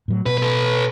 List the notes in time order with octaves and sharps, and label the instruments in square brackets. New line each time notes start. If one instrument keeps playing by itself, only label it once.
[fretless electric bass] A2 F#3
[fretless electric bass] B2 [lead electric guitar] B4
[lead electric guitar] A4 B4